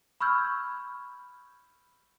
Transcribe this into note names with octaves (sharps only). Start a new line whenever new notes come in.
B5 C#6 E6 F6 G6 G#6